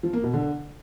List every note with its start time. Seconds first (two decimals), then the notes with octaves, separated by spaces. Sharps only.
0.03 F3
0.13 A#3
0.23 B2
0.33 D3